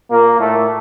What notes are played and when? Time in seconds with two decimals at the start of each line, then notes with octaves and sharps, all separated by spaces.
0.11 A#2 A#3
0.39 A2 A3